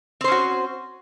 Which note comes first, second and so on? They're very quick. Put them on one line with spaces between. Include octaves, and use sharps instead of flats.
C4 C5 C#4 F#4